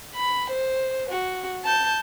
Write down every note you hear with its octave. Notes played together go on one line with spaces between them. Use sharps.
B5
C5
F#4
A5 G6